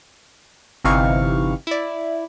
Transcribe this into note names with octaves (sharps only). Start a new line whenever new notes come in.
G1 C3 E3 D#4 F5 C#6
E4 D5